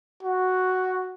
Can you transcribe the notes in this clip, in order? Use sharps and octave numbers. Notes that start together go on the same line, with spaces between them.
F#4